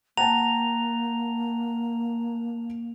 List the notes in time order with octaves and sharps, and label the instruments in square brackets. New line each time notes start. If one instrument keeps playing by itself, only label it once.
[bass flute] A#3 [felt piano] F#5 G5 A5 [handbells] A#5 [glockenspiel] F7